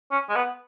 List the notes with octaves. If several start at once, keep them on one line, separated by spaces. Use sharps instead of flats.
C#4
G#3
B3